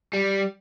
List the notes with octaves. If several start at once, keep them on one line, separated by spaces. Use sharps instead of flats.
G3